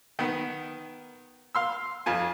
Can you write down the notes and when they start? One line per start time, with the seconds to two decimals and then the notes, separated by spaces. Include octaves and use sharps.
0.19 D#3 B3
1.55 F5 C6 E6
2.06 F2 F4 G#5